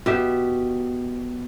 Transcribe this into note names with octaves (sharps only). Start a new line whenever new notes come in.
B2 G4 E5